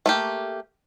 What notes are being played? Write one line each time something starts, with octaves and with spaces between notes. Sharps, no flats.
A3 A#3 G4